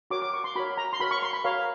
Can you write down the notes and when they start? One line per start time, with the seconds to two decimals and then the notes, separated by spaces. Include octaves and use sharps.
0.11 F#4 A#4 C#5 D6
0.22 D6
0.34 C#6
0.44 C6
0.55 F#4 A#4 C#5 B5
0.77 A#5
0.93 C6
1.00 F#4 A#4 C#5 B5
1.11 C#6
1.23 C6
1.33 B5
1.44 F#4 A#4 C#5 F5